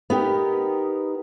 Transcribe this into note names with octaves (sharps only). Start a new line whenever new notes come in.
B3 D#4 G4 A#4